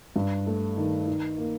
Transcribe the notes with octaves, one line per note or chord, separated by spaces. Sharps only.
G2
A3
D#3
D#4
A#3